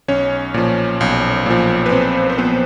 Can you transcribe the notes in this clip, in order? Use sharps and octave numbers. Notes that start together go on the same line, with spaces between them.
B1 C#4 C#5
A#2 F3
B1
A#2 F3
B4
B1 C4 C5
C5
A#2 F3 B3 B4